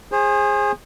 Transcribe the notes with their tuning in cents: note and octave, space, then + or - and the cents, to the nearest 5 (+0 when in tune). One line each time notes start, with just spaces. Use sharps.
G#4 -15 C5 +35